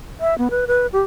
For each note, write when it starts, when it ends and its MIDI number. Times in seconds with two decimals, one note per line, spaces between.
0.20 0.37 76
0.38 0.48 59
0.51 0.65 71
0.67 0.87 71
0.93 1.02 67